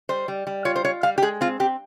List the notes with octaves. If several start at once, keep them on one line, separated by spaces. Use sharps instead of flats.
G3 C5
G3
G3
F4 C#5
C5
F4 C#5
G3 F5
G4
G#3 G#4
C4 F4
C4 G4